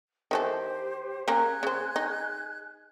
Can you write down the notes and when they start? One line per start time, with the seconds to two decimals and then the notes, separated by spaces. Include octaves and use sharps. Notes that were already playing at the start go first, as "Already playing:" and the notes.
0.31 D#3 E3 G4 A4 C5
1.28 A#3 C#4 G#4 A#4 F#6 G#6
1.63 C#3 C5
1.96 D#4